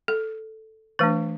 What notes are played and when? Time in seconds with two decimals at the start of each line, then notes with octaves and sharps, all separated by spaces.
0.08 A4
0.99 E3 A3 D4 B4